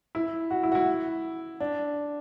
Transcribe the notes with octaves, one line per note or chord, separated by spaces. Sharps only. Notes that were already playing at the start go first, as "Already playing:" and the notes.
E4
F#4
E4
F#4
E4
D4